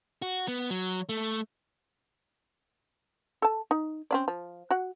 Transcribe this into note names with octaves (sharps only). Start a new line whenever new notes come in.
F#4
B3
F#3
A3
A4 A5
D#4
C4 C#4 D5
F3
F#4 F#5